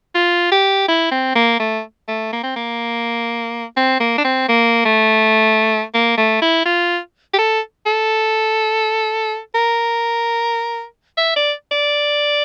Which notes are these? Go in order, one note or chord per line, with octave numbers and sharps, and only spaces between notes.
F4
G4
E4
C4
A#3
A3
A3
A#3
C4
A#3
C4
A#3
D4
C4
A#3
A3
A#3
A3
E4
F4
G4
A4
A4
A#4
E5
D5
D5